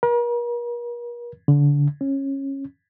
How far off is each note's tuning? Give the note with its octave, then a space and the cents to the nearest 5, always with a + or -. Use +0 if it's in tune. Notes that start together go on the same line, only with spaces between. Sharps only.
A#4 +40
D3 -30
C#4 -20